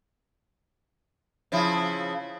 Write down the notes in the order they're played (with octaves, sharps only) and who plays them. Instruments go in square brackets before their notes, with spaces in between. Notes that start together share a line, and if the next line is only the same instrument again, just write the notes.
[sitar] C#3 F3 E4